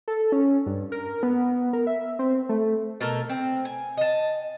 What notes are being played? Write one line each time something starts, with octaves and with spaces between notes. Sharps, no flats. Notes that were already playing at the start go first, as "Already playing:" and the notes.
A4
C#4
G2
A#4
B3
A#4
E5
C4
A3
B2 A4 A#4
C4
G#5
D#5 A5